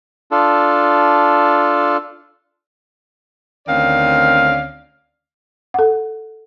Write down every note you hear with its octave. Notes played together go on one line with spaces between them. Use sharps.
D4 F4 A4
D2 D#3 C4 C#4 D5 F5
A4 F#5